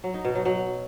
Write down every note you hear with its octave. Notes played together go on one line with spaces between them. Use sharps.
F#3
D#4
B2
F#3
F#3